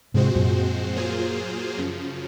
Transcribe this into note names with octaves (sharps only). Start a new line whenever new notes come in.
G#2 C3 F3 G#3 C4 F#4 C5
F#2 A#2
F#3 A#3 F4 G#4 C5
F#2 C#3 F3